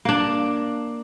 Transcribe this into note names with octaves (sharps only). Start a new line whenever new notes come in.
A#3 D4